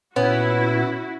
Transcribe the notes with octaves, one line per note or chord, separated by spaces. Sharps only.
A#2 B3 C#4 E4 F#4